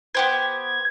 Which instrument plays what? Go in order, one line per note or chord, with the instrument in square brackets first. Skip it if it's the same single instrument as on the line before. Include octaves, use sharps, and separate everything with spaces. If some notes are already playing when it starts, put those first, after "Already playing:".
[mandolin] B3 G4 C5 [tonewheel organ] G#6